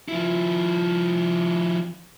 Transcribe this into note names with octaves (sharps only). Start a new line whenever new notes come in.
F3 E4